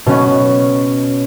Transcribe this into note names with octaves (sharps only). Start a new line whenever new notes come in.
B2 C#4